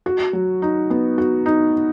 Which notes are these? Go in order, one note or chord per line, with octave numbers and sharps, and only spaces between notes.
F#4
F#3
D#4
B3
F#4
D#4